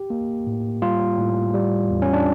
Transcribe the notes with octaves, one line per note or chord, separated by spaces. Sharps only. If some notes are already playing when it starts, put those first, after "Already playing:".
Already playing: G4
A#3
A2
G3 F4
A2
G3
E2
C#4
D4